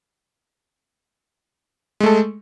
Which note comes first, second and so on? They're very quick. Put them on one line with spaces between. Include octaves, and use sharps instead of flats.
G#3 A3 A4